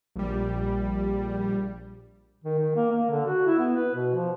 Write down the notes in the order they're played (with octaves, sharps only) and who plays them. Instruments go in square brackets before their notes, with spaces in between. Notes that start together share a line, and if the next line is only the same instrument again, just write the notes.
[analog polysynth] A#1 G3
[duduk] D#3
D#3
A#3
A#3
D3
F#4
E4
B3
B4
B2
F3